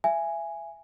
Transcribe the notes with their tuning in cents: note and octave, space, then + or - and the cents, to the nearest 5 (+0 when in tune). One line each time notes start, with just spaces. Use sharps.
E5 +30 G#5 +0